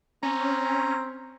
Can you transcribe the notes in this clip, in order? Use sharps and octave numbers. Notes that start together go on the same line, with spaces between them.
C4 C#4 A#5